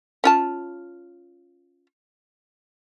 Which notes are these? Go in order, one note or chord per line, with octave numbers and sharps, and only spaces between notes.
C#4 F4 A5